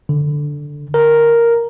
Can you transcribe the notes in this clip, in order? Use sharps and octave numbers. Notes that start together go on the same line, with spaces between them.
D3
A#4